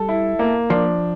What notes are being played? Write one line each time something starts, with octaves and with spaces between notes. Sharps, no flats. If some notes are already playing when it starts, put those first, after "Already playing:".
Already playing: G3 A4
E4
A#3
F3 D4